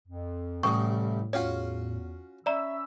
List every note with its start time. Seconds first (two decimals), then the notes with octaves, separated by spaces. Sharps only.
0.07 F2
0.63 A1 A2 C3 G3 C#6 D#6
1.19 A2
1.33 E2 C#4 F4 F#4 C#5
2.46 C#4 D5 E5 A#5 B5 E6